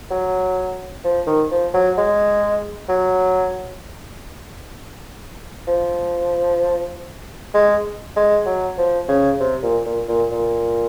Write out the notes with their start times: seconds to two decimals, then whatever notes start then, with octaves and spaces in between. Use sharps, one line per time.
0.11 F#3
1.04 F3
1.27 D#3
1.51 F3
1.74 F#3
1.97 G#3
2.89 F#3
5.67 F3
7.54 G#3
8.16 G#3
8.46 F#3
8.78 F3
9.09 C#3
9.40 C3
9.63 A#2
9.86 A#2
10.09 A#2
10.32 A#2